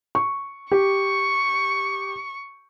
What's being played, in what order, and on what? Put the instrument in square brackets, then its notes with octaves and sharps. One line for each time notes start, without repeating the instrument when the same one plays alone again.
[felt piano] C#6
[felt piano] G4 [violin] C#6